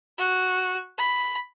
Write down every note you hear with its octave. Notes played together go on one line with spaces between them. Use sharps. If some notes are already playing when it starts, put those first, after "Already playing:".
F#4
B5